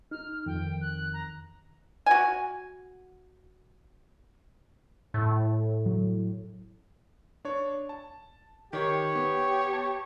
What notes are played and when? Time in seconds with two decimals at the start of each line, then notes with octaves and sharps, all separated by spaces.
0.11 D#4 F6
0.46 F2 D#3 G5
0.81 F#6
1.13 A#5
2.06 F#4 G#5
5.14 A2
5.86 F#3
7.45 D4 C#5
7.89 A5
8.73 D#3 G4 C#5
9.15 B3
9.73 A5